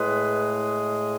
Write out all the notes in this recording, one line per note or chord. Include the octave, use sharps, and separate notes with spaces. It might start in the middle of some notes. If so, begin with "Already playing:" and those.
Already playing: A2 G#3 B4